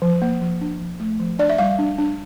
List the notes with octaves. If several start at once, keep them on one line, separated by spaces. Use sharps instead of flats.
F3
A#3
F3
D4
F3
A3
F3
D4 D5
E5
G3 F5
D4
D4